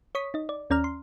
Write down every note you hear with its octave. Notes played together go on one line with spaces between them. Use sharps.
C#5 C#6 D#6 B6
D#4 D#5
D5
D#2 C#4 D5 A#5 F6
C6